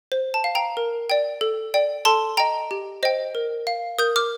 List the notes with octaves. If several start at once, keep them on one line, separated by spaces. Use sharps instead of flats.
C5
A5
F5
G5 A#5
A#4
D5 G5
A4
D5 G5
A4 A5 C6
D#5 G5 A#5
G4
C5 D#5 G5
A#4
F5
A#4 D#6 G6
D6 F6